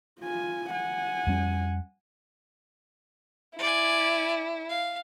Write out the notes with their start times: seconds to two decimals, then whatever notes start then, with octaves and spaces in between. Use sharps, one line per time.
0.20 F4 G#5
0.71 F#5 G#5
1.27 F2 G3 C#4
3.59 E4 D5 G#5
4.69 F5